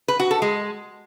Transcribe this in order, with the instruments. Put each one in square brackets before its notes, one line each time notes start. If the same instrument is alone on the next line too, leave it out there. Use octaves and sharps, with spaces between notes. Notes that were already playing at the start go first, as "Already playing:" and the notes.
[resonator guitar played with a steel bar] B4
F#4
A4
G#3